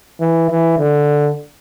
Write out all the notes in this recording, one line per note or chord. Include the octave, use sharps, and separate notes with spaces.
E3
E3
D3